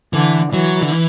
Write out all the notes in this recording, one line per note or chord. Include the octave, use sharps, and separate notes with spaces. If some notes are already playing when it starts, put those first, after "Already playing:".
D3 E3
E3 F#3
D3
E3